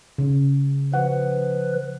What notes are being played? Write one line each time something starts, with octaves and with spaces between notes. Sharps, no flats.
C#3
F3 B4 F#5